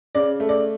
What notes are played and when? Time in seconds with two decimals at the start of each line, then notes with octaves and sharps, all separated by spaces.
0.15 C#3 D5
0.40 A3
0.49 D5